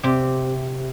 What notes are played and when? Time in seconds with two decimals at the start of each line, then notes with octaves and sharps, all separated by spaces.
0.03 C3 G4